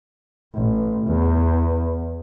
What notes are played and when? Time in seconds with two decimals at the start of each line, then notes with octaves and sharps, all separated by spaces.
0.55 A1
1.07 E2